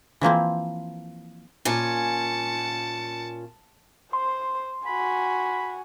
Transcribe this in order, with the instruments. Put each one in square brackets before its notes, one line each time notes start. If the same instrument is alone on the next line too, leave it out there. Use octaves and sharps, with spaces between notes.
[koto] E3 F3 A#3 C4
[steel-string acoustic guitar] A#2 C#4 G#5 [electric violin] A5 C#7
[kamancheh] C5 [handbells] C6
[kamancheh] F#4 G#5 [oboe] B5